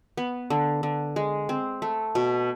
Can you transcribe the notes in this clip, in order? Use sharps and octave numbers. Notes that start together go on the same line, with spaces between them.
B3
D3
D3
G#3
C4
A3
B2